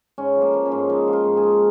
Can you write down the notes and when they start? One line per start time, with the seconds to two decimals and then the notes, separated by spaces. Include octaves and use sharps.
0.18 G#2 C#4
0.36 F3
0.41 A#3
0.54 F3
0.66 C#4
0.72 G#2
0.89 F3 D#4
1.08 F3
1.13 F4
1.25 G#2
1.37 G#4
1.43 F3